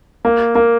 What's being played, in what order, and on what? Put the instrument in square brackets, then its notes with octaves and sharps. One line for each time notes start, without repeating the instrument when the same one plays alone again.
[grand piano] A#3
A#3